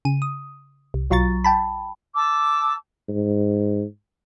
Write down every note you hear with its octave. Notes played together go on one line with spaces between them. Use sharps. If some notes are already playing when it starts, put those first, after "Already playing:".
C#3 D#7
D#6
C2
B1 F#3 F4 A#5 C#6 A6
G5 A5 B5
A5 D6 E6
G#2